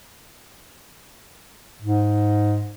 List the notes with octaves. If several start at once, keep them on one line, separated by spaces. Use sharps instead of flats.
G#2